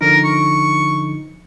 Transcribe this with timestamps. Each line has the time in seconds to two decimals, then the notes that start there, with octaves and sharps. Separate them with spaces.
0.01 D3 F3 D#4 A#4
0.25 C#6